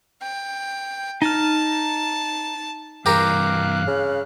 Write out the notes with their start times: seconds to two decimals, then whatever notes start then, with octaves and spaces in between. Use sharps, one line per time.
0.22 G5
1.22 D#4 A5 F6
3.06 G2 E3 G4 A#4 F5 F#6
3.87 C#3